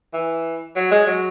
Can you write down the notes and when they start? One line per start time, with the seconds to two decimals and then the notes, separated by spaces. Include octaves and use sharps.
0.14 E3
0.75 F#3
0.91 G#3
1.07 F#3